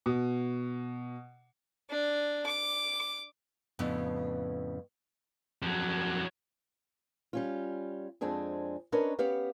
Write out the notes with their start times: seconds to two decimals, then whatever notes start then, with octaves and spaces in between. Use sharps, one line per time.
0.06 B2
1.90 D4
2.46 D6
3.79 F2 A2 C#3 B3 D4
5.62 F2 F#3
7.33 G3 C#4 F4
8.21 F2 G#3 C4 D4 G#4
8.92 C#4 D4 A#4 B4 C#5 D#5
9.19 B3 C#4 G4 B4 F5